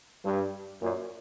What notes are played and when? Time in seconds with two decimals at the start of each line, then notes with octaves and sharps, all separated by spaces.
0.25 G2
0.82 F#2 A#2